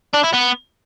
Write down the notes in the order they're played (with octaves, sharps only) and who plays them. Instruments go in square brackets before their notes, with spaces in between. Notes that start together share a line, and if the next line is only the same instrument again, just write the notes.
[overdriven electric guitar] D4
E4
B3